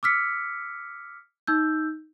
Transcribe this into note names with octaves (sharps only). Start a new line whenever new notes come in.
D6 E6 F6 B6 C#7
D#4 E6 G6